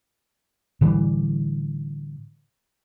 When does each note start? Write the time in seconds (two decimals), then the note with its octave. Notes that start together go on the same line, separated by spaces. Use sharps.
0.81 A2 D3 E3 G3